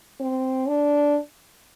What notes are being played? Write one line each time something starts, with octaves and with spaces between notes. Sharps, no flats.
C4
D4